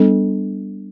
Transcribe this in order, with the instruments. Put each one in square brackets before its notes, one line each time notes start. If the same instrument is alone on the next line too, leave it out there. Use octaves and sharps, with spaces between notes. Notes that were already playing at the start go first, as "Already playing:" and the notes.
Already playing: [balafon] G3 B3 D4 A4